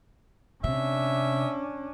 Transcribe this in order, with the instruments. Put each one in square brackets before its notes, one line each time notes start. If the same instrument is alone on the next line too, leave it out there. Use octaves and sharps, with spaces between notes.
[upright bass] C3 [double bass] C#4 D4 [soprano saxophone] E5